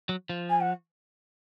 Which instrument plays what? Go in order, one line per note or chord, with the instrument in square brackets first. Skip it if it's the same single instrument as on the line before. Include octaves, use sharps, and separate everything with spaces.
[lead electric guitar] F#3
F3
[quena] G#5
F#5